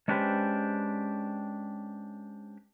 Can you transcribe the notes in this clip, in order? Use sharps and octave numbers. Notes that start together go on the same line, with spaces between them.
G#3 C#4 D4 G4 B4 C5